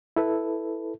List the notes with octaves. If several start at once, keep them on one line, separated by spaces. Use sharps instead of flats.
E4 A4 B4